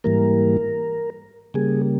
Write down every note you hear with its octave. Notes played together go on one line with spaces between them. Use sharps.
G#2 E3 G3 A#3 A#4
C#3 G3 A#3 G#4